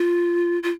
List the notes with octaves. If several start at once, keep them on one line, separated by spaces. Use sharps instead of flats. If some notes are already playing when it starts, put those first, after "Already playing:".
Already playing: F4
F4